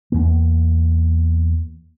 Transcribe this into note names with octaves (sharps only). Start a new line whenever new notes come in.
E2 A#3